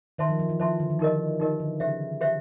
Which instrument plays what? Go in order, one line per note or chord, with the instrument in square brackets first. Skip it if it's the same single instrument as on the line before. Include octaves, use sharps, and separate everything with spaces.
[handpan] D#3 [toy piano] C5 E5 A5 C6
[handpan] F3
F3
E3
[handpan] F3 [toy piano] C5 E5 A5 C6
[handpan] D3
D#3
[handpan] E3 [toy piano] D#4 G4 A#4 D#5
[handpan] E3 [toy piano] D#4 G4 A#4 D#5
[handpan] D3
[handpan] C#3 [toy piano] G4 C5 E5
[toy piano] G4 C5 E5